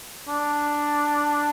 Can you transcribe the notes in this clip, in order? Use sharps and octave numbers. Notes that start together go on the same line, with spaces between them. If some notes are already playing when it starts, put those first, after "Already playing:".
D4